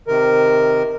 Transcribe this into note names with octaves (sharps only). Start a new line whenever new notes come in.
C3 D#3 A#4